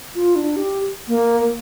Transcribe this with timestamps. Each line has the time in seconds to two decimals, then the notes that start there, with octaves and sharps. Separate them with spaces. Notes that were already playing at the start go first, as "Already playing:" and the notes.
0.15 F4
0.36 D4
0.56 G4
1.08 A#3